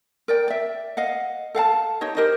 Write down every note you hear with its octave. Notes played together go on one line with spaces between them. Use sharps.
A#4 D5 G5
D5 E5
D#5 F5 F#5
A4 F5 F#5 A5
D#4 G4 C#5 D#5
G4 A#4 C5 D#5